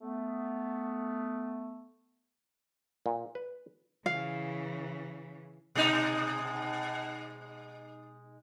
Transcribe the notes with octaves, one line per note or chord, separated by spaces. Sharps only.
A3 B3
A#2
B4
C#3 E3 F5
B2 G#3 D#4